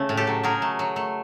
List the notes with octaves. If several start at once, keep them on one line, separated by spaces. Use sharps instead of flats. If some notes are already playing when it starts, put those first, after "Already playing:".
Already playing: C#3 A3
A2
G4 A4
F#3
F#3 G#4 A#4
A3
F#3
A3